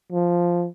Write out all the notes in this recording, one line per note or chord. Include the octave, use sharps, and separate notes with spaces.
F3